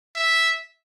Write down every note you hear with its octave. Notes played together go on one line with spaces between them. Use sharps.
E5